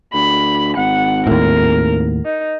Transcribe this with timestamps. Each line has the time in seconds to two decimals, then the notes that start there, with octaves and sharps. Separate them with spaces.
0.14 D2 B5
0.76 G#1 F#5
1.27 D#2 A2 A#4
2.25 D#4